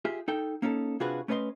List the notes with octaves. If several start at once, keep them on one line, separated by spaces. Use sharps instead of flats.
F4 G4 G#4 E5
D#4 A4 G5
A#3 C#4 D#4 G#4 A4
C3 D4 F4 F#4 G#4 B4
A3 C#4 B4 D5 D#5 C6